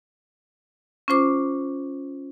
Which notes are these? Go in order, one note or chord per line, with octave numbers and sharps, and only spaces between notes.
C#4 F4 C5 D6